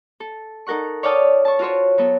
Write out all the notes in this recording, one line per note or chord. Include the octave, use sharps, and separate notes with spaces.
A4
D#4 A4 A#4 F#5 C#6
C#5 D5 F5 G5 A5 D#6
A5 C#6
F4 F#4 C5 C#5
F#3 B3 A4